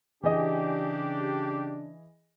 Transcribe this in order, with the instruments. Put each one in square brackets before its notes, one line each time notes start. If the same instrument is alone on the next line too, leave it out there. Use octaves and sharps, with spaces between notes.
[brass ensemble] C#3 D4 [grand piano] E3 G#4 D#5 [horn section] G4